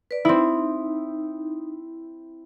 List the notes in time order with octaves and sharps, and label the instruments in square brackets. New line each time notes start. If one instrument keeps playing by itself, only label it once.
[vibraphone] B4 D5
[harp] C4 E4 [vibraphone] D#4